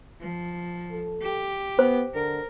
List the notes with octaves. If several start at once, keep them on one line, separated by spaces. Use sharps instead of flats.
F3
A4
G4
B3 C5
D3 A#4